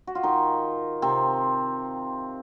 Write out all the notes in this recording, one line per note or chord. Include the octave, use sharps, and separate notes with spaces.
F#4
F4
D#3 D#4
C3 C4